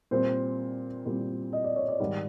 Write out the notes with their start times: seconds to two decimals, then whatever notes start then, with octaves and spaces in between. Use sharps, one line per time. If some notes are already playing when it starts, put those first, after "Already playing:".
0.11 A#2 G3 C4 C5
1.06 A#2 G3 C4
1.53 D#5
1.64 D5
1.76 C#5
1.89 D5
2.00 G#2 D#3 G3